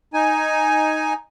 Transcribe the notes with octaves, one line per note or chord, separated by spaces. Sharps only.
D#4 G#5